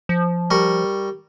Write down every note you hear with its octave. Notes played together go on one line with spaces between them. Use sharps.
F3
G3 A#4 C#6